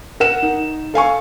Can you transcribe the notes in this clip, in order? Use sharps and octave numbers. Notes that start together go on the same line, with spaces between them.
A#4 F#5 E7
D#4
A4 F5 G#5 C#6